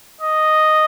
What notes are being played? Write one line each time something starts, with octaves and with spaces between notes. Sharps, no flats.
D#5